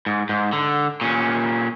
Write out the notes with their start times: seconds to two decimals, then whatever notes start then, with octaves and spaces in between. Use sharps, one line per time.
0.06 G#2
0.29 G#2
0.53 D3
1.01 A#2 C#4